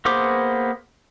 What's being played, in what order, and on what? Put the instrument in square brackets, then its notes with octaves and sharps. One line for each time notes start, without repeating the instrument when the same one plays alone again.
[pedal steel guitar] A#3 B3 G#4 C5 D6